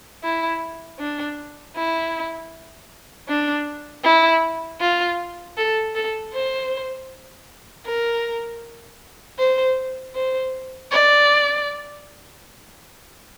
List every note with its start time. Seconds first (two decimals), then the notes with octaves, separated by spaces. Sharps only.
0.24 E4
0.99 D4
1.76 E4
3.29 D4
4.04 E4
4.81 F4
5.57 A4
5.95 A4
6.34 C5
7.86 A#4
9.39 C5
10.15 C5
10.91 D5